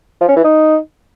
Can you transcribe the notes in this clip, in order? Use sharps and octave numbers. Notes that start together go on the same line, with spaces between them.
F3
C#4
E3
D#4